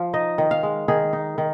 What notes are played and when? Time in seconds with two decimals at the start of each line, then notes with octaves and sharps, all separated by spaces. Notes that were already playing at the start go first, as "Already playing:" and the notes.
Already playing: F3 F5
0.14 D#4 D#5
0.38 D#3
0.51 F5
0.63 G#3
0.88 D#3 G#4
1.13 D#4
1.38 D#3